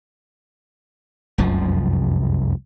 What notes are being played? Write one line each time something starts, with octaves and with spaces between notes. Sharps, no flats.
F1 C2 F#2 F3